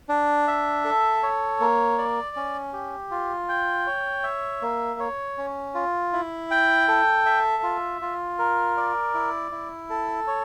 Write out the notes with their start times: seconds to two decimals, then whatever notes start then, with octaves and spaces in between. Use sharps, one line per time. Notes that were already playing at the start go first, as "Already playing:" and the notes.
0.09 D4
0.48 E5
0.84 A4
1.23 C#5
1.60 A#3
1.98 D5
2.36 C#4
2.73 G4
3.11 F4
3.49 G5
3.87 C#5
4.24 E5
4.62 A#3
5.00 C#5
5.38 C#4
5.75 F4
6.13 E4
6.51 G5
6.88 A4
7.26 E5
7.63 F4
8.01 F4
8.39 A#4
8.77 D5
9.14 E4
9.51 E4
9.90 A4
10.27 C#5